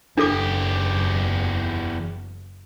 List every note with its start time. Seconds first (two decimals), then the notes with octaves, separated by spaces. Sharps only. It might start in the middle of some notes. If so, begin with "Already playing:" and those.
0.18 F#1 E2 D4 G4 A4 D6